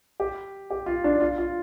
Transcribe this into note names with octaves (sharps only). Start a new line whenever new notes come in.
G4
G4
F4
D4
F4
F4